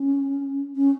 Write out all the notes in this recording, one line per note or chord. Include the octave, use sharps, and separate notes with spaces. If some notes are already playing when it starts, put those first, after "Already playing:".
Already playing: C#4
C#4